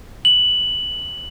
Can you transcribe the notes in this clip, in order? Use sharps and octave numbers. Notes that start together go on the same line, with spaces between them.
F#7